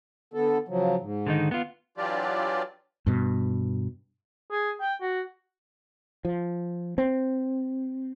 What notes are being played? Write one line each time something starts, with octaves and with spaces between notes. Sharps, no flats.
D3 B3 A4
C#3 F3 F#3
G#2
D3 D#3 D#4
B3 F4
E3 F#3 D4 F4 G4 D5
G2 B2
G#4
G5
F#4
F3
C4